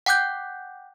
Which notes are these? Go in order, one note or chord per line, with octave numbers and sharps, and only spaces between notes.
F#5 G5 D6 F#6 G6